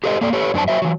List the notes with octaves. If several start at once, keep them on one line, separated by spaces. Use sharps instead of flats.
G4 A4 C5 D#5
A#3 A4 D5
G4 A4 B4 C#5
F#2 B3 D4 C5 A5
F#3 C5 E5
E3 F#3